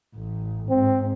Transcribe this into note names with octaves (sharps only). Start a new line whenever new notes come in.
A1
G#2 C4